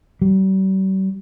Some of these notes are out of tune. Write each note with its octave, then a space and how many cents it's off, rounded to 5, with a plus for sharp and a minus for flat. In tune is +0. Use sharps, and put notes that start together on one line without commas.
G3 -45